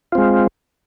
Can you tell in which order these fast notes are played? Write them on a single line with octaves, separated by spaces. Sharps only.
F4 C4 G#3